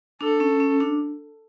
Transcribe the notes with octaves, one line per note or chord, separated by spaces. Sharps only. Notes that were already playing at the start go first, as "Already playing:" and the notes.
D4 A4
C#4
C#4
D4